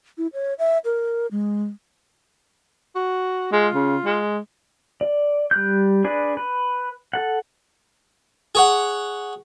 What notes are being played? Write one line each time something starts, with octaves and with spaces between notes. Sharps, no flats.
E4
C#5
E5
A#4
G#3
F#4
G#3 F4
C#3
G#3
D5
G3 F#6 G6
D4 G#4 B4 D5
B4
A4 F#5
G#4 C#5 F#5